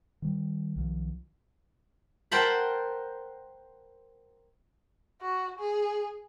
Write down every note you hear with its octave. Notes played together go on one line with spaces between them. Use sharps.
D#3 G3
B1 D#3 F3
A#4 C5 F#5 G5 A5 B5
F#4
G#4